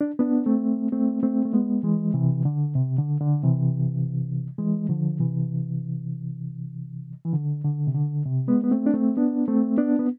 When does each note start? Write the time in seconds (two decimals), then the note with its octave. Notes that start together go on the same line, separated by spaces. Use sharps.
0.01 D4
0.19 B3 D4
0.46 A3 C4
0.92 A3 C4
1.23 A3 C4
1.45 A3
1.53 G#3 B3
1.83 E3 G#3
2.14 C3 E3
2.45 D3
2.75 C3
2.99 D3
3.21 D3
3.43 C3 E3
4.58 E3 G#3
4.89 D3 F3
5.19 C3 E3
7.25 E3
7.33 D3
7.64 D3
7.87 C3
7.95 D3
8.25 C3
8.48 G#3 B3
8.64 B3
8.71 A3 C4
8.86 D4
8.94 A3 C4
9.17 B3 D4
9.48 A3 C4
9.77 B3 D4
9.99 B3